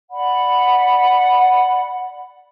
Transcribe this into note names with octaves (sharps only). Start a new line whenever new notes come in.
D5 F#5 B5